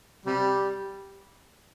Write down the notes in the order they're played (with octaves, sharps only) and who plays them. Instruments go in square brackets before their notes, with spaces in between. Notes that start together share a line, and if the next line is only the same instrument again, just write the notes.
[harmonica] C3 G3